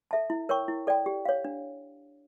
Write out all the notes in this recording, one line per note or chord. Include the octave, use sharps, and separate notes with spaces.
A4 E5 A5
E4
A#4 C#5 G5 C#6
E4
A4 D5 G5
G4
C#5 F5
D4